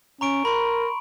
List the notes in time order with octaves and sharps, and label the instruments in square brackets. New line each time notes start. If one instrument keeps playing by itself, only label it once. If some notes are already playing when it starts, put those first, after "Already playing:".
[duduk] C#4 [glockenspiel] A#5 C#6 D7
[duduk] A#4 [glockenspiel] B5 C6